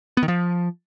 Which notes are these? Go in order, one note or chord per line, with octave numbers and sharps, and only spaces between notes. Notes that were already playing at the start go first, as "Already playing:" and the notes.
B3
D#3
F3